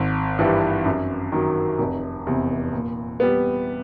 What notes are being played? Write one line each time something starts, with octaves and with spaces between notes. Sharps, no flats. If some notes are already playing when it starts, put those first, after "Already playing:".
Already playing: G#1
G2 E3 G3
F#2
D#3 F#3
F1
E2 C3
A#2
G3 B3